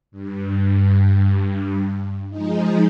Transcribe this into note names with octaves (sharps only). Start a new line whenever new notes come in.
G2
F3 G#3 D#4